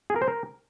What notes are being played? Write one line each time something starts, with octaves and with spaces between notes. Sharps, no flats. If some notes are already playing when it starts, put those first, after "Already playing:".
G#4
A#4
C5
A#4